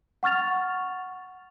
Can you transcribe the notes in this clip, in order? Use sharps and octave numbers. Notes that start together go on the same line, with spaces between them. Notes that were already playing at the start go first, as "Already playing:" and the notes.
F#5 C#6 F6 A6 F7